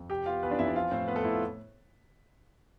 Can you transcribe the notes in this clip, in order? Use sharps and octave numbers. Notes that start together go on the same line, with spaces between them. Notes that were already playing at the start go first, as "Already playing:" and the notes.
Already playing: F2
C3 G4 G5
B3 F4 F5
E3 B3 B4
D4 D5
F2 E4 E5
D4 D5
F3 F4 F5
A2 C4 C5
B3 C4 B4
A3 A4
A2 E4
F4